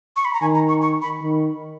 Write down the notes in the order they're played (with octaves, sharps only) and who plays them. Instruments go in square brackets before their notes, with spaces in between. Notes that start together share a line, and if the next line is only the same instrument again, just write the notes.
[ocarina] C#6
B5
A#5
[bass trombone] D#3 [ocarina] G#5
[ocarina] A#5
C#6
C#6
B5
[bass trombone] D#3